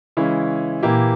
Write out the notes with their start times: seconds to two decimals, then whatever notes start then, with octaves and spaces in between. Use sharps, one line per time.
0.17 C#3 E3 G#3 C#4 E4
0.83 A#2 E3 A#3 E4 G4